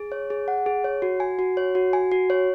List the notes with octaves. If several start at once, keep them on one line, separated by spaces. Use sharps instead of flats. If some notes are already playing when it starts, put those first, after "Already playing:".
Already playing: G#4
C#5
G#4
F#5
G#4
C#5
F#4
G#5
F#4
C#5
F#4
G#5
F#4
C#5